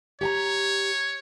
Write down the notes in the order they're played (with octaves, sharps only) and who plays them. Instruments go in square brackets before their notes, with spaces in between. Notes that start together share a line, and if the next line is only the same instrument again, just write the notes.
[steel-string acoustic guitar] G4 G#5 A#5 [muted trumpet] C#5